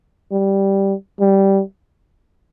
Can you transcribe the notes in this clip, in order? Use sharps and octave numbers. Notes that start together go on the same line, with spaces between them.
G3
G3